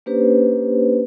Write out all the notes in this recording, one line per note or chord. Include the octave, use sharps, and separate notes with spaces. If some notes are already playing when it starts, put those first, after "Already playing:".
A#3 C#4 D4 G4 B4 C5